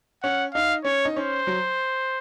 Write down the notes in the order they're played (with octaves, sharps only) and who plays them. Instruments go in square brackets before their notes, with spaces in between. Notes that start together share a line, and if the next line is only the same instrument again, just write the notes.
[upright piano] C#4 [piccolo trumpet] F#5
[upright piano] D#4 [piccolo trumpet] F5
[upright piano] C#4 [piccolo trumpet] C#5
[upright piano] D#4
[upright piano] C#4 [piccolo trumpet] C5
[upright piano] F#3